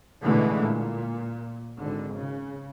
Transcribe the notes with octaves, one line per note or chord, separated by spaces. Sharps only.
A1 B2 D3 E3 G#3 A3
A#2
G#1 D3
C#3